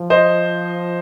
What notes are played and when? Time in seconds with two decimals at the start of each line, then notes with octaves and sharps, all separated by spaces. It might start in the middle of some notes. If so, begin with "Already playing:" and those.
Already playing: F3
0.10 C5 D#5